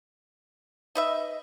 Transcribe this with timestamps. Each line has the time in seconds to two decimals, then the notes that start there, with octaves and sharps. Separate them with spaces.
0.95 D#4 B4 D#5 E5